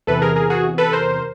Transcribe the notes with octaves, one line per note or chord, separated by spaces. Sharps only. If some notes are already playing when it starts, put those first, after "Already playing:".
E2 C3 E3 A4 B4
G#4 A#4
G#4 A#4
F#4 G#4
A4 B4
A#4 C5